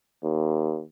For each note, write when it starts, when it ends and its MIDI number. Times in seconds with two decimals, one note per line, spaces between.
0.24 0.82 39